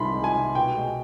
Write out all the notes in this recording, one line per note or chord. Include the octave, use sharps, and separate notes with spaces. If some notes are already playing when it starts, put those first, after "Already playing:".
Already playing: C2 C3 D#3 G#3 B5 C6
G#3
G#5
C3
B2 G5
G#3